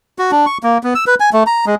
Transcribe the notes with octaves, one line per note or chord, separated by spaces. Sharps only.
F#4
D4
C#6
A#3
B3
E6
B4
G#5
A3
A#5
G#3